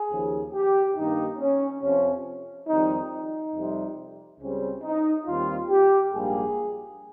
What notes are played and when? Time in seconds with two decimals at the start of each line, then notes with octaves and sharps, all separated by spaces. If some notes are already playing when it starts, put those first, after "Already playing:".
Already playing: G#4
0.10 D#2 C#3 F3
0.53 G4
0.96 G2 D#3 A#3 D#4
1.38 C#4
1.81 F2 C3 F3 C#4
2.68 F2 D#3 G3 C4 D#4
3.11 D#4
3.53 F2 C3 G3
4.40 C#2 C#3 G3 C4 C#4
4.83 D#4
5.26 D#2 D#3 G3 C4 F4
5.69 G4
6.12 A#1 G#2 G3 A#3 G#4